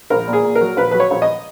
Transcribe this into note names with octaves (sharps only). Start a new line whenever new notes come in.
A#1 A#4
A#2
G#4
A#2
A#4
F#3
A#1 B4
F#3 B4
C#5
A#1
D#5